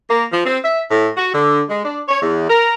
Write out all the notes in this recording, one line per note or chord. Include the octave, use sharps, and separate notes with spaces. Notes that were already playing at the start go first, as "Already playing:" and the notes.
A#3
F3
C4
E5
A2
F#4
D3
G#3
D4
C#5
E2
A#4